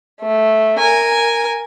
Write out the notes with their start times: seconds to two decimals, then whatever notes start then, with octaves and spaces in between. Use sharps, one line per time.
0.21 A3
0.78 A#4 G#5